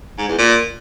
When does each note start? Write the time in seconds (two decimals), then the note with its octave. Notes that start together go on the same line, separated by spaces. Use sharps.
0.18 G#2
0.28 E2
0.39 A#2